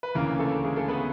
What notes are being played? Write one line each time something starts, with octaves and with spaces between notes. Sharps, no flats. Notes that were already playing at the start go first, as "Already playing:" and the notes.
B4
D2 C#3 E3 A#3 A#4
A3 A4
G#3 G#4
A3 A4
B3 B4